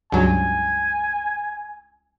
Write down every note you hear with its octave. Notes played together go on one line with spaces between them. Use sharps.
C#2 G2 F#3 G#5